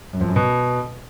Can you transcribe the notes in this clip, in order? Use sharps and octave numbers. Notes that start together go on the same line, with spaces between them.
F#2
F2
F#2
B2